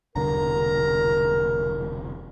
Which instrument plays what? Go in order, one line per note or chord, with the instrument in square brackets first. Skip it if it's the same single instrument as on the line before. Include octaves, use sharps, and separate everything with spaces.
[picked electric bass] E1 C2 D3 [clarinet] A#4 [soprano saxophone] A#5